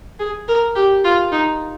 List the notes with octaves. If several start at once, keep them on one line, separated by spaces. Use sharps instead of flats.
G#4
A#4
G4
F4
D#4